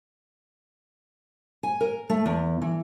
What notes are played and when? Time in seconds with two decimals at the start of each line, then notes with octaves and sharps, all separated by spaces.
1.63 G#5
1.81 A#4
2.10 A3
2.26 E2
2.62 E3